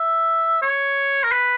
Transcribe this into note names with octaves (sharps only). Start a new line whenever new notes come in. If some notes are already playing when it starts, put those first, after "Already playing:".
Already playing: E5
C#5
A#4
B4